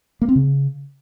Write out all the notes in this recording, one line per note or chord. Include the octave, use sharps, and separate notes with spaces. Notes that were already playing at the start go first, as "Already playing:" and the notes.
A#3
C4
C#3